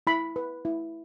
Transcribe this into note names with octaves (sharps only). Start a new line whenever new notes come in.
E4 B5
B4
E4